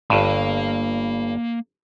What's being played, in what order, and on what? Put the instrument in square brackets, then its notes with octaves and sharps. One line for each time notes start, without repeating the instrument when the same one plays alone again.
[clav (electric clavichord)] G1 G2 [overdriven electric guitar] A#3 F5